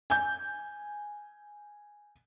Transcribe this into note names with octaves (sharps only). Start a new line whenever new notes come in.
G#5 G6